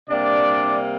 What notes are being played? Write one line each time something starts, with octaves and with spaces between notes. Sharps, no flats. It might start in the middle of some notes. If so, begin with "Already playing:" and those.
C3 G3 A#3 D4 D5